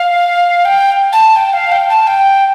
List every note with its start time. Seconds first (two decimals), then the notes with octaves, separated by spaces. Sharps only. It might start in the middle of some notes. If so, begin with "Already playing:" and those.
Already playing: F5
0.65 G5
1.13 A5
1.36 G5
1.53 F5
1.72 G5
1.89 A5
2.07 G5